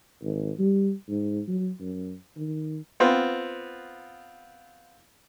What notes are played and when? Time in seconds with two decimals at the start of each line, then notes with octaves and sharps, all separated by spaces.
0.22 G#1
0.59 G3
1.09 G#2
1.48 F#3
1.80 F#2
2.37 D#3
3.00 B3 C4 F4